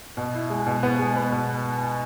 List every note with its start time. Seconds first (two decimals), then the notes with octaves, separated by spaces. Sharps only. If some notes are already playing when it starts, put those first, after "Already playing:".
0.17 B2
0.34 E4
0.50 G#3
0.67 B2
0.83 B3
0.99 G#3
1.16 B3
1.32 B2